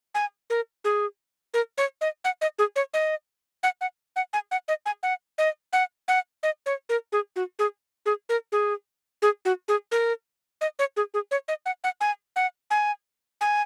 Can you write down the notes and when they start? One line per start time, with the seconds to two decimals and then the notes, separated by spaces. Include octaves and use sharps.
0.15 G#5
0.50 A#4
0.84 G#4
1.54 A#4
1.78 C#5
2.01 D#5
2.24 F#5
2.41 D#5
2.59 G#4
2.76 C#5
2.94 D#5
3.63 F#5
3.81 F#5
4.16 F#5
4.33 G#5
4.51 F#5
4.68 D#5
4.86 G#5
5.03 F#5
5.38 D#5
5.73 F#5
6.08 F#5
6.43 D#5
6.66 C#5
6.89 A#4
7.12 G#4
7.36 F#4
7.59 G#4
8.06 G#4
8.29 A#4
8.52 G#4
9.22 G#4
9.45 F#4
9.68 G#4
9.92 A#4
10.61 D#5
10.79 C#5
10.97 G#4
11.14 G#4
11.31 C#5
11.48 D#5
11.66 F#5
11.84 F#5
12.01 G#5
12.36 F#5
12.71 G#5
13.41 G#5